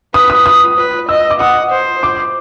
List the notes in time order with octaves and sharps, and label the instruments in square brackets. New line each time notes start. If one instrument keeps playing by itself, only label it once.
[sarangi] B4 [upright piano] D#6
[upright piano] D#6
D#6
[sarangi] B4
[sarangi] D#5 [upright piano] E6
[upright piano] D6
[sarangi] F#5 [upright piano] D#6
[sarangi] C5
[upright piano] D6